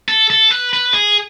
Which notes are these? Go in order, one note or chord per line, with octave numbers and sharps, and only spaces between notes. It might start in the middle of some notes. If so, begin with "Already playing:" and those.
A4
A4
B4
B4
G#4